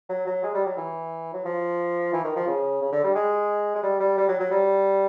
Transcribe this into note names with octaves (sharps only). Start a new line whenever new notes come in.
F#3
F#3
G#3
G3
F#3
E3
F#3
F3
E3
D#3
F3
C#3
C#3
D3
G3
G#3
G#3
G3
G3
G3
F#3
F#3
G3